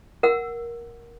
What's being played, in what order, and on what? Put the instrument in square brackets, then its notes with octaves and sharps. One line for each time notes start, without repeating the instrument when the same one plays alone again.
[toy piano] A#4 F#5 E6